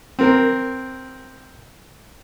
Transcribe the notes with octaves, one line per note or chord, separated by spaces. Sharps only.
C4 A#4